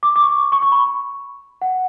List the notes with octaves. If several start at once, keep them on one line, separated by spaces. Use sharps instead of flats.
D6
D6
C#6
C#6
C#6
B5
F#5